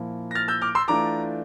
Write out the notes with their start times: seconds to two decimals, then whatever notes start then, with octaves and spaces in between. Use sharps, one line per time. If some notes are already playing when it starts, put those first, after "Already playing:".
Already playing: A#2 F3 A#3 E4
0.31 A#6
0.35 F6 A6
0.48 E6 G6
0.62 D6 F6
0.75 C6 E6
0.88 E3 A3 D4 F4 A#5 D6